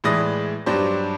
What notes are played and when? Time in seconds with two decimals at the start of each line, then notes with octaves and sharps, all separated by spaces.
0.04 A2 E3 G#3 D5 D#6 A#6
0.66 G2 F#3 D4 G4 C5